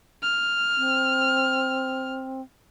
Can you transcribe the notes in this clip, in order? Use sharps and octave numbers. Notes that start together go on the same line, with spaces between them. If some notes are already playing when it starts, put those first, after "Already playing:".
F6
C4